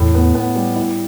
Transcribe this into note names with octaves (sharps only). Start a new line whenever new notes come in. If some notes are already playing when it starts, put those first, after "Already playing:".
Already playing: E2 A2
B3
B3
G3
E4